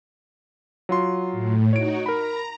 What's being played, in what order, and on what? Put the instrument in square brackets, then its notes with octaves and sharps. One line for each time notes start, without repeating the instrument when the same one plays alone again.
[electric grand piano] F#3 F4 C6
[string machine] A2
[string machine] D#4 F#4 [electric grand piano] C#5 D7
[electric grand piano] A#4 B5 [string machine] A#5